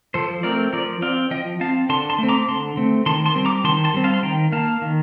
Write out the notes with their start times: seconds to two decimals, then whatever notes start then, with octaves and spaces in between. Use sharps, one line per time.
0.14 F3 A4 C5
0.43 A3 C4 A#4 D5
0.73 F3 A#4 D5
1.02 C4 D5 F5
1.31 F3 D#5 G5
1.61 C4 F5 A5
1.89 D3 A5 C6
2.10 A5 C6
2.18 A3 C4
2.28 A#5 D6
2.48 D3 A5 C6
2.77 A3 C4
3.06 D#3 A5 C6
3.26 A5 C6
3.35 G3 C4
3.45 A#5 D6
3.64 D#3 A5 C6
3.84 A5 C6
3.94 G3 C4
4.04 F5 A5
4.14 C6
4.23 D#3 G5 A#5
4.52 A#3 F5 A5
4.82 D#3